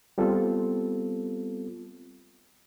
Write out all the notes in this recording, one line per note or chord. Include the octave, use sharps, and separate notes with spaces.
G3 B3 C4 F4 A4